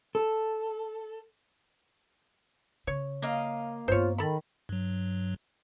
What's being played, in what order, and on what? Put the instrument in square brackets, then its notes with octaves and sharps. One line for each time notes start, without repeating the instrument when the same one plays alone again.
[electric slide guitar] A4
[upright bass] C#3 [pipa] C#5
[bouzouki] A#3 D#5 F5
[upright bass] G2 B3 [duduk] F4 [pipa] C5 C#5
[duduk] D#3 [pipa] A4 B5
[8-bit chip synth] G2 F#3